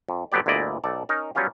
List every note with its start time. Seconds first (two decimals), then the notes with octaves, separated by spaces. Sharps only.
0.09 F2
0.32 G1 D3 F#3 B3 G4 D5
0.46 G1 D2 A#2 E4 D5 D#5
0.84 B1 A4 D5
1.09 C#4 D#4 A#4
1.35 F#3 G3 B3 C#4 F4 G4